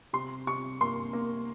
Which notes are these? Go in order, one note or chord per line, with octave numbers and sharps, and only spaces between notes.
C3 C6
C3 C#6
A#3 C6
A#3